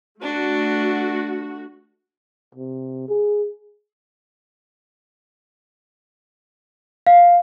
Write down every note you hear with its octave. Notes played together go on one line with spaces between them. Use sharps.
A3 D4 F#4
C3
G#4
F5